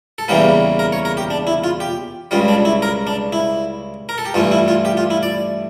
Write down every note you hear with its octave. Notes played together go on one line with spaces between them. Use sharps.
A4
E2 C#3 E3 G3 A#3 G4
A#4
C#5
A#4
G4
D4
E4
F4
G4
C#2 C#3 G3 F4
D4
E4
A#4
D4
E4
A#4
A4
G4
G2 E3 A3 F4
E4
F4
G4
F4
E4
D5